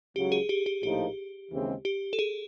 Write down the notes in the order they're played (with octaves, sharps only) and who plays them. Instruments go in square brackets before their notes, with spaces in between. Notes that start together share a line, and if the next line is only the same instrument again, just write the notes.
[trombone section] C#2 C#3 F#3 [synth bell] G4
[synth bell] G#4
G4
G4
[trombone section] A#1 A2 F3 A#3 D#4 [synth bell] G4
[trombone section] D#2 C#3 E3 G#3 C4
[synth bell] G4
A4
G#4